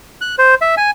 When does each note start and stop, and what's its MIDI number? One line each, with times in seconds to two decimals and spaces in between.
0.21 0.35 90
0.38 0.55 72
0.62 0.75 76
0.77 0.91 80